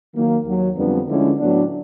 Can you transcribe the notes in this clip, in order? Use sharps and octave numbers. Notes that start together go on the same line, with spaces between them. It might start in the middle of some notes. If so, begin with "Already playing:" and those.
D#3 F#3 A#3
D#2 D#3 F#3
F2 D3 G3 B3 D4
D3 F3 G#3 C#4 E4
A2 F#3 B3 D4